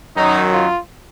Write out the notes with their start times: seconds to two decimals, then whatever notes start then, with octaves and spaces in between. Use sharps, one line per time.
0.15 F#2 D#3 F#3 D#4
0.52 F4